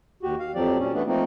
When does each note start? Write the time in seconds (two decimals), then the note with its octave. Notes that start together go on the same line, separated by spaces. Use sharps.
0.23 D#2 F#4 G4
0.39 F5
0.55 F2 F3 F#3 G4 D5
0.79 A#2 C#4
0.94 E3 A3 B3 D4
1.07 F3 A3 A#3 C4 D#4